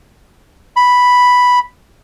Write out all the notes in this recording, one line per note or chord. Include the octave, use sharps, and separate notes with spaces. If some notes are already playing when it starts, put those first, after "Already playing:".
B5